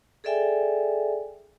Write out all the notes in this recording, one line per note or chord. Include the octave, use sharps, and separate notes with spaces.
G#4 A4 D5 E5 G5 G#5